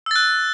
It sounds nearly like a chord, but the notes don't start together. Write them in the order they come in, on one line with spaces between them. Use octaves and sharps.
E6 A6 F#6